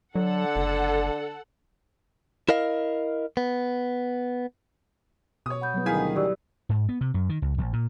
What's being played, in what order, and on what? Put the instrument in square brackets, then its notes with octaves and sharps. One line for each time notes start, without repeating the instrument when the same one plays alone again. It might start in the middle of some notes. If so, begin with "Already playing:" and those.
[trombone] D3 [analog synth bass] F#3 [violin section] A4 F#5
[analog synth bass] F#1
[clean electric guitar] E4 A#4 D#5 F5
B3
[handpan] B2 [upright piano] C#5 D#6
[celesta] F#5 B5 G6
[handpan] F#3 G3 B3
[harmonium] D2 D#3 G#4 [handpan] E4 [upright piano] F5 G#5 B6
[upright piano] B2 [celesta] G4 D5 E6
[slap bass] G#2
B3
C3
F#2
D#3
C#2
A#1
A#2